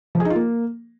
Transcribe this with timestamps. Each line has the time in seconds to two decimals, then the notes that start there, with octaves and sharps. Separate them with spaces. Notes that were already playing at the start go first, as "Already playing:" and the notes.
0.15 F3
0.20 G#4
0.25 D#4
0.30 F4
0.35 A#3